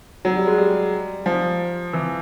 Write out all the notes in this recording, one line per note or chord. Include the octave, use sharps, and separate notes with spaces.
F#3
G3
G#3
G3
F3
E3